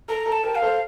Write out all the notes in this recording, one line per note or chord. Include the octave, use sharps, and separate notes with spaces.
A4 A#5
A4
A5
G4 A#4
F5
A4 C5